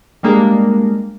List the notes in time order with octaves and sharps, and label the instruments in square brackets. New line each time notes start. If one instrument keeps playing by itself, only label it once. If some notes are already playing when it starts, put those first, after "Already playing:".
[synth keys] G3 G#3 A#3 D4